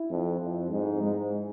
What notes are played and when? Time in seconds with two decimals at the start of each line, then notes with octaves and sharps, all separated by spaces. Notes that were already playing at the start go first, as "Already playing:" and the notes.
Already playing: E4
0.10 F2
0.40 F2
0.71 G#2
1.02 G#2